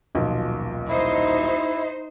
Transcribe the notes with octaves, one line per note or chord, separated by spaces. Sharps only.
D#1 B1 F3
D#4 E4 C5